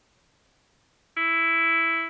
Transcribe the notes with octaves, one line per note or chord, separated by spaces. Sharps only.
E4